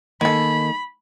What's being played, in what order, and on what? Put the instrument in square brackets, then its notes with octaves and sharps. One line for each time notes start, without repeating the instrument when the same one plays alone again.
[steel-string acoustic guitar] D#3 A#3 [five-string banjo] G#3 A4 [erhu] B5